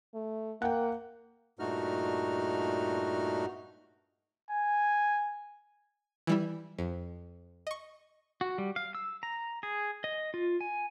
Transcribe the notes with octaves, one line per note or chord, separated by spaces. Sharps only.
A3
A#3 F#5 G5
G2 A#2 A3 D#4 F#4 F6
G#5
E3 G3 E4
F2
D#5 C#6
F#4
G3
F5
E6
A#5
G#4
D#5
F4
G#5